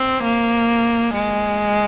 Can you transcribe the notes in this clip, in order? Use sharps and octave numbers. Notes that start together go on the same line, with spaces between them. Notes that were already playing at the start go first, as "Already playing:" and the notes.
Already playing: C4
A#3
G#3